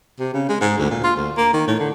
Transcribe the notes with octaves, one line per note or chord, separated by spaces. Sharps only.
C3
C#3
G#3
G#2
D2
A#2
F4
D2
A#3
D#3
A2
D3